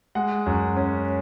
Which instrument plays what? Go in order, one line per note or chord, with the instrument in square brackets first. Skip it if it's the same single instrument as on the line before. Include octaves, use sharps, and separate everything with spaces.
[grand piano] G#3 F#5
F#2
C#4